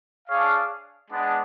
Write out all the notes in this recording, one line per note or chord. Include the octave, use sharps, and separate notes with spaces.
D4 G#4 C#5 F5
G#3 B3 D4